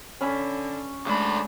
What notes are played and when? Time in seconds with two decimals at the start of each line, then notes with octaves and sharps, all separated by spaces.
0.21 D3 C#4 G#5 B5 F#6
1.06 D2 G#3 A3 D4 B5 E6